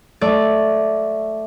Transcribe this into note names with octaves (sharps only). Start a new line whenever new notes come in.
A3 D5